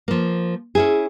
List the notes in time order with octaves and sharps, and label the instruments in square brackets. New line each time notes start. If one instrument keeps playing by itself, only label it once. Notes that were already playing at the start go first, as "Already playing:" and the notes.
[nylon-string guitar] F3 A#3
C#4 E4 G#4